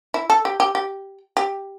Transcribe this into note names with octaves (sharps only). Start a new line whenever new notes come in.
E4
A4
G4
G4
G4
G4